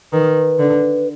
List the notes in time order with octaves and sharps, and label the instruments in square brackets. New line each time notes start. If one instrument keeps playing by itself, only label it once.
[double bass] D#3 [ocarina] B4
[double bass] D3